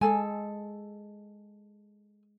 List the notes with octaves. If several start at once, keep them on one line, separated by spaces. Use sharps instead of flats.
G#3 G#4 A4 G#5